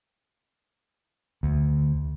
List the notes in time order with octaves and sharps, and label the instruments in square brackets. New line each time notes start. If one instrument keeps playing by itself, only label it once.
[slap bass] D2